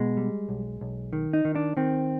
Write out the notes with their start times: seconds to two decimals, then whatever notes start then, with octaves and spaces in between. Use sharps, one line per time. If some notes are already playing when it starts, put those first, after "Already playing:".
Already playing: B2 G#3
0.17 G3
0.49 B1
0.81 B1
1.13 D#3
1.33 D#4
1.45 D#3
1.56 D4
1.77 D#3 C4